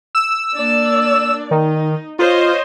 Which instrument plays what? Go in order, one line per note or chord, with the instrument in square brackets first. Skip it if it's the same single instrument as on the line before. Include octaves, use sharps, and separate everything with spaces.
[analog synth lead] E6
[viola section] A#3 D4 D5
[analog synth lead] D#3 [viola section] D#4
[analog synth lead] F4 [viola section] C5 C#5 D#5